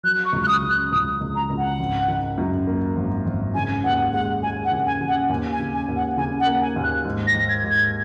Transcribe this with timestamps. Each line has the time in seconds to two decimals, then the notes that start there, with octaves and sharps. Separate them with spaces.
0.03 F#3 F#6
0.25 C#6
0.33 C#2
0.43 F#6
0.48 D#6
0.62 C#3
0.69 F#6
0.92 C#2 D#6
1.21 C#2
1.35 A#5
1.50 C#2
1.58 F#5
1.79 G#1
2.08 D#3
2.38 F#2
2.67 A#3
2.96 G#1
3.26 G#1
3.54 C#3 G#5
3.84 D#2 F#5
4.13 G#3 F#5
4.43 G#3 G#5
4.64 F#5
4.72 C#3
4.86 G#5
5.01 C#3
5.08 F#5
5.30 D#2 G#5
5.52 G#5
5.59 C#3
5.74 G#5
5.89 D#2
5.96 F#5
6.17 C#3 G#5
6.40 F#5
6.46 A#3
6.61 G#5
6.76 D#2
6.83 F#6
7.05 G#2
7.27 A#6
7.35 G#2
7.49 G#6
7.64 G#2
7.71 G#6